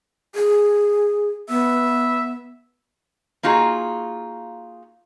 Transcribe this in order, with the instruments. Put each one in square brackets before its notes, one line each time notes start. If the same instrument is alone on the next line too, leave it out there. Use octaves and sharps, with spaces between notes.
[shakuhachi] G#4
[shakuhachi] B3 [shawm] E5
[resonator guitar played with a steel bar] A#3 D#4 F4 F#4 G#4